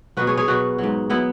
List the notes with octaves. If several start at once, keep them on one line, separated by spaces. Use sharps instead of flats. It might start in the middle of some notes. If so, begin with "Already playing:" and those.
B2 F#3 F#4 B4
G#4 C#5
G#4 C#5
B2 F#3 F#4 B4
G#2 F#3
F#3 B3 E4